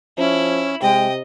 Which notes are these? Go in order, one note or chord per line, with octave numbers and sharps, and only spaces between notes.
F3 C#4 E4
C3 G#3 D#5 G5